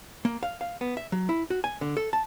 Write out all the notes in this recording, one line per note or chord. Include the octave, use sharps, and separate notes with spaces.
A#3
F5
F5
B3
E5
F#3
E4
F#4
G#5
D3
A4
A5